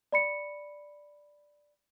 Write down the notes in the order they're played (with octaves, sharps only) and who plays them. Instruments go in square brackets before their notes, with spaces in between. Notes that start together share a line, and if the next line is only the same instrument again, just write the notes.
[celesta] D5 B5 C#7